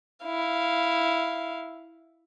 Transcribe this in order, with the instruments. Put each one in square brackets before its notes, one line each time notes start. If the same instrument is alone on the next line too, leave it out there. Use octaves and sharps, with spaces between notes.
[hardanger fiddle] E4 F5